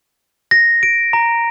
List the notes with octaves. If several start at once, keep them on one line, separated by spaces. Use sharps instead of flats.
A#6
D7
A#5